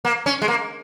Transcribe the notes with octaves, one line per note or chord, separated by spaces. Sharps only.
A#3
C#4
G#3
A#3